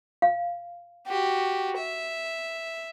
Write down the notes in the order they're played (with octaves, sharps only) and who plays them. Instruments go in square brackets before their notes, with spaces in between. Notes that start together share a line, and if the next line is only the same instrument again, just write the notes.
[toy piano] F5
[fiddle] F#4 G4
E5